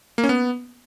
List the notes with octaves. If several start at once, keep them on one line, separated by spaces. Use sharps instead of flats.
A#3
C#4
B3